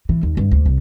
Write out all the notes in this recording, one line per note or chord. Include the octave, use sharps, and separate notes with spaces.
E3
D#2
G2
D2
C2